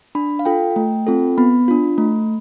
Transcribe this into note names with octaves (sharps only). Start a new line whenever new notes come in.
D4 B5
F5
F4 A4 G5
A3
C4 F4 A4
B3 B5
D4 F4
A3